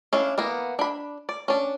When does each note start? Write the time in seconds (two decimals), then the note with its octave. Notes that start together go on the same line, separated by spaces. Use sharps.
0.13 C#4 D4 E4 F5
0.38 E3 A#3 B3
0.79 D4 B5
1.29 D5
1.48 C#4 D4